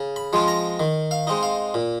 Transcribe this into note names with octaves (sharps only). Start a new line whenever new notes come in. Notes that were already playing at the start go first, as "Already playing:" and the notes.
Already playing: C#3
B5
F3 G#3 C4 F4
A#5
D#3
F5
G#3 C4 D#4
F5
A#2